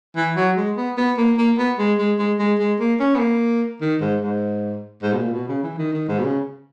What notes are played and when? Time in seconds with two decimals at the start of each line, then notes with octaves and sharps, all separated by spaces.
0.16 E3
0.36 F#3
0.57 G#3
0.77 B3
0.97 B3
1.17 A#3
1.38 A#3
1.58 B3
1.78 G#3
1.98 G#3
2.19 G#3
2.39 G#3
2.59 G#3
2.79 A#3
3.00 C#4
3.15 B3
3.19 A#3
3.81 D#3
4.01 G#2
4.21 G#2
5.02 G#2
5.13 B2
5.17 A#2
5.33 B2
5.48 C#3
5.63 E3
5.78 D#3
5.93 D#3
6.08 G#2
6.19 B2
6.24 C#3